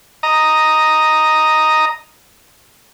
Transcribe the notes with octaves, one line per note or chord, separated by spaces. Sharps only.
D#5 A#5